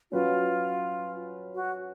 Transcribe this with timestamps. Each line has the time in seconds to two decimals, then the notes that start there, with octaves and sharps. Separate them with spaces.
0.12 F#3 C#4 F4 F#4 B4
1.55 F#4